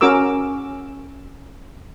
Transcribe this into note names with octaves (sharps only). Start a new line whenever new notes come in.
C#4 F#4 A#4 D6 E6